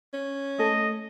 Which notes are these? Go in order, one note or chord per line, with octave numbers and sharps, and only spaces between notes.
C#4
A3 A4 D#5